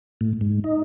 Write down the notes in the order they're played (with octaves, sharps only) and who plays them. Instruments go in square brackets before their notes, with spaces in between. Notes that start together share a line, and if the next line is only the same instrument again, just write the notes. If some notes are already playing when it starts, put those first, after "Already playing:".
[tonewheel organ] A2
G#2
D#4